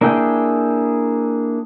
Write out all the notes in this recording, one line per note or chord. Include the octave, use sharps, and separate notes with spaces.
A#3 D4 E4 G#4 G5